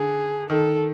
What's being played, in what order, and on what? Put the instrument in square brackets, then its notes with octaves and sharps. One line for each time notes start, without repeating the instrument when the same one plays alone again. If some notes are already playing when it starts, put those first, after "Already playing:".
Already playing: [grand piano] D3 [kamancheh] G#4
[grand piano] D#3 [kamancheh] A4